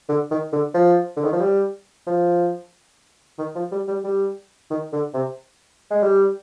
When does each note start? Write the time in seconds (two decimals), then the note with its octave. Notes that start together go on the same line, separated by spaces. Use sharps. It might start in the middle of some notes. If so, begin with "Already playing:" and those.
0.09 D3
0.31 D#3
0.53 D3
0.74 F3
1.16 D3
1.25 D#3
1.32 F3
1.40 G3
2.07 F3
3.39 D#3
3.55 F3
3.72 G3
3.88 G3
4.04 G3
4.70 D#3
4.93 D3
5.14 C3
5.91 G#3
6.03 G3